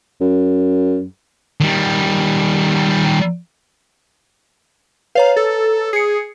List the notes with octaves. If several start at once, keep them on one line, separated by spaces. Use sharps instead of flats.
F#2
D#3 G3
B4 C#5 F5 A#5
A4
G#4 C7 C#7